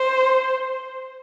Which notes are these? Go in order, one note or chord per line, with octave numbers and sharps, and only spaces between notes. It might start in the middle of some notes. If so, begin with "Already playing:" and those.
Already playing: C5